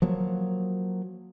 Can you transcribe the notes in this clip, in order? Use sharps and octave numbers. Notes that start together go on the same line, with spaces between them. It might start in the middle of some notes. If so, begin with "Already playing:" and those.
F3 F#3 A#3